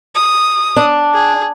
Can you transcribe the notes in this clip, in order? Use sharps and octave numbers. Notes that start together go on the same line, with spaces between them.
D#6
D4
G#4